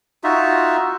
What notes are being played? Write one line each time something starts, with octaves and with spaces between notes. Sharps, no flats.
D#4 F4 F#4 E5